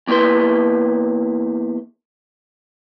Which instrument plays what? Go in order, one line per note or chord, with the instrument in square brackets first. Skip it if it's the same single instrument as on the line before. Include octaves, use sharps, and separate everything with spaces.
[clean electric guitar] E2 A#3 E4 B4 C6